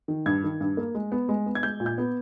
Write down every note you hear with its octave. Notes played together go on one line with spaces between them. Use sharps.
D#3
G2 G#6
D#3
G2
A#3
G#3
B3
G#3
B3
G#6
G#3 G6
A#2
G6
B3